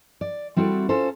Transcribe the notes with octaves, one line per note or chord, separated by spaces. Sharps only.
D5
G3 C4 E4 F#4 A4
C#4 F4 A4 C5